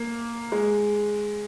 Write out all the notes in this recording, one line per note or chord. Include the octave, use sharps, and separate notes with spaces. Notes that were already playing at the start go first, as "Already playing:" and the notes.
Already playing: A#3
G#3